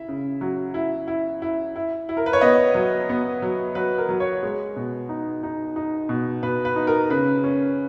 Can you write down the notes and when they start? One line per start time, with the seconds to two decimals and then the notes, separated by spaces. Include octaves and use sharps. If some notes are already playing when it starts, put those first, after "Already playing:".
Already playing: E4 E5
0.08 C#3
0.41 F#3
0.74 E4
1.08 E4
1.42 E4
1.76 E4
2.09 E4
2.17 A#4
2.26 B4
2.33 C#5
2.41 B3 D#5
2.75 F#3
3.09 B3
3.42 F#3
3.75 F#3 B4
3.98 A#4
4.09 F#3
4.20 C#5
4.43 G#3
4.76 B2
5.09 D#4
5.43 D#4
5.76 D#4
6.09 B2
6.43 B2 B4
6.65 B4
6.76 D#4
6.87 A#4
7.10 C#3 B4
7.44 C#4